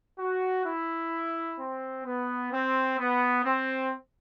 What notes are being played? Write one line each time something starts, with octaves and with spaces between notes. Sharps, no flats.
F#4
E4
C4
B3
C4
B3
C4